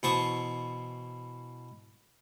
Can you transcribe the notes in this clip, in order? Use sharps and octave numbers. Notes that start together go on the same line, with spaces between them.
B2 E3 C5 A5 C#6 D#6